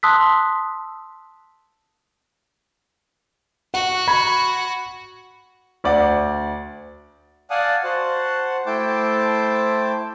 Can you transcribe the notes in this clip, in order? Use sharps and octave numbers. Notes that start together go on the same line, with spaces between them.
A5 C6 D#6 E6 F#6 B6
F#4 F#5
B5 G#6
D2 D5 F#5
D5 F5 F#5 G#5 A5 D#6
F#4 C5 F#5 A5
A3 E4 C5 G5 A5 D6